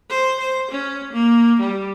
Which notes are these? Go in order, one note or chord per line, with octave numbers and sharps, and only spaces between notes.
C5
C5
C#4
A#3
G3